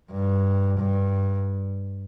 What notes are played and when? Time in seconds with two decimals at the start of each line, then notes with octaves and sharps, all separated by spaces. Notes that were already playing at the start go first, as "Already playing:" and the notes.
0.11 G2
0.78 G2